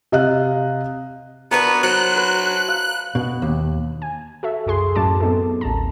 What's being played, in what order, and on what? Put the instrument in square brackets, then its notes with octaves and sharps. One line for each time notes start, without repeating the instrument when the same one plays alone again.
[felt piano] C3 D#5 F5 F#6
[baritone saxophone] B3 [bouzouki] D4 F#4 B4 [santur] A#4 A5
[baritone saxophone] F#3 [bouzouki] C5 [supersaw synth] F#6
[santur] B4
F5
[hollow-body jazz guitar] B2
D#2
[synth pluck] G#5
F#4 A4 E5
C2 F#2 F#4 G#4 C6
F#2 A2 F#3 C#4 A5 D6
B3 C4 D#4 A4
A1 D#2 A5 A#5